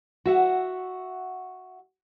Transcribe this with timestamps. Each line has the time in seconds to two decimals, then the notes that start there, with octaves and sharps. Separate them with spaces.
0.25 F#4 E5 F#5